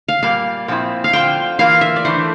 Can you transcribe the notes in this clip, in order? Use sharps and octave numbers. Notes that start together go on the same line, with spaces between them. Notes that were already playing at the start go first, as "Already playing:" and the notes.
F5
A#2 G3 A#3 F5
A#2 F3 C4 E4
F5
D3 F3 C4 F4 G5
E3 A#3 F4 F5
E5
D5
E3 A3 D4 C5